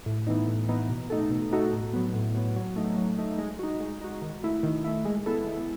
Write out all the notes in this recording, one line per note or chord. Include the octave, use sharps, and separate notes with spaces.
A2
E3 B3 D#4
A2
E3 B3 D#4
B2
A3 D#4 F#4 A4
B2
A3 D#4 F#4 A4
A2
F#3 B3
A2
F#3 B3
F#3
A3 D#4
F#3
A3 D#4
G#3
D#4 F#4
G#3
D#4 F#4
D#3
A3 E4
D#3
A3 E4
G#3
B3 E4 A4
G#3